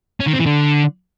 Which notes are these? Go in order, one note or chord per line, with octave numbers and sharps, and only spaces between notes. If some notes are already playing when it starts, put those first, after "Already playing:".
C#4
D#3
C4
E3
D3